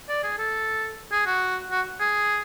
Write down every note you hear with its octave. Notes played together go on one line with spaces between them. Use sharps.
D5
G#4
A4
G#4
F#4
F#4
G#4